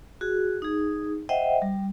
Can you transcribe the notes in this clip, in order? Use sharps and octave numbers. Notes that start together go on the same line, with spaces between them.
F#4 G#4
D#4 G#4
C5 D#5 E5 F#5 G5
G3